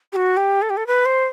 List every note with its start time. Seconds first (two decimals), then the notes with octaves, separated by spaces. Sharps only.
0.13 G4
0.16 F#4
0.37 G4
0.62 A4
0.70 G4
0.77 A4
0.87 B4
1.06 C5